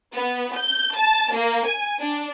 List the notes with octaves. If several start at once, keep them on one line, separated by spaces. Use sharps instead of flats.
B3
G6
A5
A#3
G#5
D4